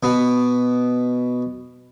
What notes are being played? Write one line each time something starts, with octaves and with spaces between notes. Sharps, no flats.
B2 B3